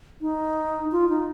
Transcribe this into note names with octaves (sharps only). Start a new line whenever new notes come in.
D#4
F4
D#4